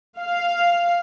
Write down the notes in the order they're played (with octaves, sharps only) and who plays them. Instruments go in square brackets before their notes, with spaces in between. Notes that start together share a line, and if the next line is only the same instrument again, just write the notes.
[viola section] F5